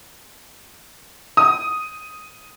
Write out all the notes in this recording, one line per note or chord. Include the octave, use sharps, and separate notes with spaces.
D#6